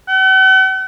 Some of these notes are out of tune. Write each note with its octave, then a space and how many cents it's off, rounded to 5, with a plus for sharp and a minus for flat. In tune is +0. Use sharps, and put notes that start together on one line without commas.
F#5 +45